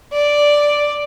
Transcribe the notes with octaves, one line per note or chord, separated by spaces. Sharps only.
D5